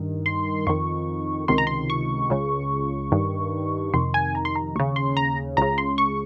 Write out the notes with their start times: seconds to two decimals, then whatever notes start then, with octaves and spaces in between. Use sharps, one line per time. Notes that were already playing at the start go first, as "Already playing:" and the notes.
Already playing: G2 D#3
0.26 C6
0.67 F2 D#3 C#6
1.48 C#2 C3 D#3 C6
1.58 A#5
1.67 C6
1.90 C#6
2.30 C#2 C#3
3.12 G2 D#3
3.94 F2 C3 D#3 C6
4.14 G#5
4.35 A#5
4.45 C6
4.56 A#5
4.75 D#2 C#3 C#6
4.96 C6
5.17 A#5
5.57 C#2 C#3 A#5
5.78 C6
5.98 C#6